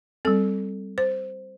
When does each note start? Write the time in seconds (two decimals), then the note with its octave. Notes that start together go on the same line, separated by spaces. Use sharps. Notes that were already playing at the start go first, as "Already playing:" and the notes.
0.25 G3 C4 A4
0.98 C5